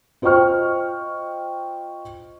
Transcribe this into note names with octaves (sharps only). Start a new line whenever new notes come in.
F4 C5 D#5 G5 C#6 F6